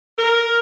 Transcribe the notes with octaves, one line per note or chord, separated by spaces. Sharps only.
A#4